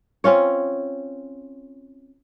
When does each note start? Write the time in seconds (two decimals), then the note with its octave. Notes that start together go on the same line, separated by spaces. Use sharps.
0.24 C4 C#4 F4 C#5